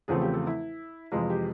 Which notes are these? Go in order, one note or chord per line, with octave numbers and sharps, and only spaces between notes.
E2 C#3 F3 A3 C4 G#4
G4
A4
E4
F2 C3 E3 G#3 F4
G4